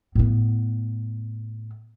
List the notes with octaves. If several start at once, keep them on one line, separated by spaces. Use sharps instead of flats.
A2 B3